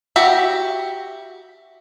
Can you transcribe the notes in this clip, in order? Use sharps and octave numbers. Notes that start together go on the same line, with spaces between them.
F#4 G4 E5